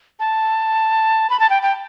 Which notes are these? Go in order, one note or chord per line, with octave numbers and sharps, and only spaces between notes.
A5
B5
A5
G5
G5